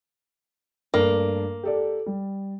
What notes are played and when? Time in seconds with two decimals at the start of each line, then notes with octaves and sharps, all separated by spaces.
0.94 G2 A3 A#3 D4
1.63 G4 A4 D5
2.06 G3